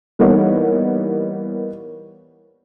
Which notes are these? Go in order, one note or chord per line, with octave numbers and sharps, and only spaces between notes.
E3 G3 A#3 B3 D#4 C#5